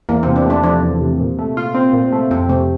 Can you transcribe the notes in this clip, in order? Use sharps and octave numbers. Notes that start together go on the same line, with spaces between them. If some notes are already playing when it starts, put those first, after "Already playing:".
E2 A#3
C3 C4
D4
A3 D4
F3 D4
E2
C3
A#2
A3
F4
C4
A#2
A3
F2 C4
C3 A3